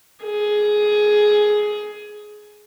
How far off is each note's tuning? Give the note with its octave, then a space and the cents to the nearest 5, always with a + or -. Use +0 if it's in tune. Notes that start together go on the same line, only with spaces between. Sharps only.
G#4 +15